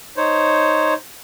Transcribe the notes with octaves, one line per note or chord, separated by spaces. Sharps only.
D#4 C5 C#5